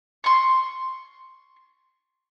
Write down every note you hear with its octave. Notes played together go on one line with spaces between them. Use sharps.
C6 C#6